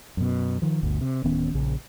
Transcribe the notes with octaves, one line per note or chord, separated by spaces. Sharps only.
F#2 B2
D#3 F3
G1 D2
C3
D1 D#3 B3 C#4
A#1 C#3